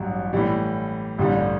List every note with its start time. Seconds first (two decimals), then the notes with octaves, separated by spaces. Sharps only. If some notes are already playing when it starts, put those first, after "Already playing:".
Already playing: A1 G2 F#3
0.33 A2 E3 G3
1.19 A1 G2 D3 G3